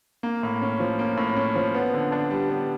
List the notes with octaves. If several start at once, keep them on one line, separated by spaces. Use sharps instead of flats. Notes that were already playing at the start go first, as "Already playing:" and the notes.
A#3
A2
C#4
F3
A#3
A2
C#4
F3
B3
D3
D4
G3
B3